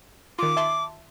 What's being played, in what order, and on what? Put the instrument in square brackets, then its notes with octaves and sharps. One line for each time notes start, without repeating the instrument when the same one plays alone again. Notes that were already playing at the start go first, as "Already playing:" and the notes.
[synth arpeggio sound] D#3 F4 [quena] D6
[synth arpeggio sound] E5 A5 C6